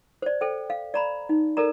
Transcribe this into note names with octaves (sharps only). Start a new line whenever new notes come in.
C5 D5
A4 C5 G5
F5
D5 A#5 B5
D#4
A4 A#4 D5 A#5